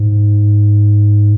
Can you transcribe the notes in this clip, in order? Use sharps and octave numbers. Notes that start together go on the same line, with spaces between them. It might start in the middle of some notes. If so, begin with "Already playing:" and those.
Already playing: G#2